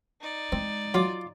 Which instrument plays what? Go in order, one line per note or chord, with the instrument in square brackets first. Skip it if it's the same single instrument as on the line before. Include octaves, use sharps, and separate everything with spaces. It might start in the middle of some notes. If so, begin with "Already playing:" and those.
[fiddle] D#4 D5
[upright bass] G#3 [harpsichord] C4
[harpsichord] F#3 [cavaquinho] F4 D6